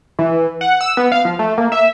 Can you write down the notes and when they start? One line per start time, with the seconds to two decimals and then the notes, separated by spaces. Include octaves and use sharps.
0.19 E3
0.61 F#5
0.81 E6
0.97 B3
1.12 F5
1.25 F3
1.39 A3
1.58 A#3
1.72 E5